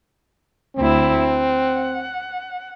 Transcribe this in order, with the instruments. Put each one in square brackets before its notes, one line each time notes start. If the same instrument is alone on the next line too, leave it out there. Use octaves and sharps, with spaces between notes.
[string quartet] D2 E4 [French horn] C4
[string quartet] F#5